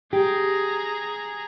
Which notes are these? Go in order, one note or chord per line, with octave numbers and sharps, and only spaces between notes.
G4 G#4 A#5